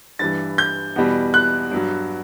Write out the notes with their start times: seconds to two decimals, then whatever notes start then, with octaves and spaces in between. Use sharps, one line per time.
0.19 G2 E3 G3 A6
0.58 G6
0.96 E2 B2 G3
1.34 F#6
1.71 G2 F#3